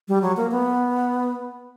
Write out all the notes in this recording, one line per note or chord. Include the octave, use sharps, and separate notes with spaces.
G3
F#3
A#3
B3